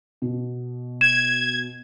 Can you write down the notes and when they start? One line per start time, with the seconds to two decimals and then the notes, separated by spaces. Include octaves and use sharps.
0.22 B2
1.01 G#6 E7